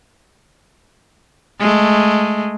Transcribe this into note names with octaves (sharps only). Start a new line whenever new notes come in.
G#3 A3